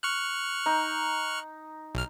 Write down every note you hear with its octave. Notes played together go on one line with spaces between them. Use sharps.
C#6 F6 F#6
D#4
B1 F6